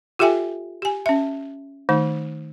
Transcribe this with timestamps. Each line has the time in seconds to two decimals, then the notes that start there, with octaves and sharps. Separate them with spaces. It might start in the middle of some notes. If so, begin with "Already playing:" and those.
0.19 F4 G4 A4 E5 G5 G#5
0.82 G4 G#5
1.06 C#4 E5
1.89 D#3 A3 D#4